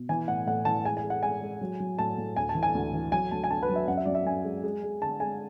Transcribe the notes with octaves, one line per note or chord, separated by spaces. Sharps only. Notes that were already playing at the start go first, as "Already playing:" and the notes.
Already playing: B2
E3 G#5
A2 F#5
A2 F#5
E3 A5
G#3 G#5
G#5
G#3
F#5
G#3 G#5
G#3
F#3
F#3
A2 A5
A2
D2 G#5
A5
E3
G#5
D2
E3
F#3 G#5
D2 A5
G#5
D3 A5
B4
F#3
E5
F#2 F#5
E5
F#2 D5
E5
F#2 G#5
G#3
G#3
G#3
D3 A5
G#3 G#5